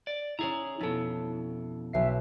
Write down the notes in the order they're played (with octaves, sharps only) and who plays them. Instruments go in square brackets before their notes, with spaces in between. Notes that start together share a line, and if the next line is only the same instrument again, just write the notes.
[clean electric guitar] D5
[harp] C#4 E4 [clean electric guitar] G#4 A#5
[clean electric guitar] F2 B2 [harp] E4 A4
[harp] B1 C7 [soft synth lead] E5